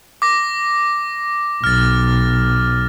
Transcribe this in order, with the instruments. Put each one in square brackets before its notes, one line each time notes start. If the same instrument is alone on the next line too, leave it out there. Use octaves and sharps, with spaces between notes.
[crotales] D6 A#6
[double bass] B1 [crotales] F6 A6